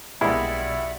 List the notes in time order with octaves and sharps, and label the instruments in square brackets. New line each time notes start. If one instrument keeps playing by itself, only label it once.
[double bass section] B1 [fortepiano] G2 G#3 E4 [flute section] D5 E5 F#5